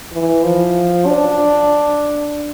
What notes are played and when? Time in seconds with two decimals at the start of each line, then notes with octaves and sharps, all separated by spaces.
0.12 E3
0.44 F3
1.07 D4